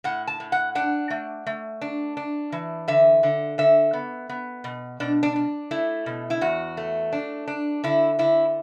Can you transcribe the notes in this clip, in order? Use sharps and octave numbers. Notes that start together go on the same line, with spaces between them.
A2 F#5
A5
A2
F#5
D4 F#5
A3
A3
D4
D4
E3
D3 E5
D3
D3 E5
B3
B3
B2
B2 D4
D4
D4
A3 E4
B2
E4
E2 F#4
A3
D4
D4
D3 E4
D3 E4